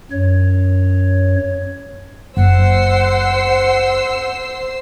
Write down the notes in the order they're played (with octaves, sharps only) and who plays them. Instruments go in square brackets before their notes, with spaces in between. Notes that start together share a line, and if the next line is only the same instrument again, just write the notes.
[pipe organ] F#2 C#5
[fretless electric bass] F#1 [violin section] C5 E6 C7 [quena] F#5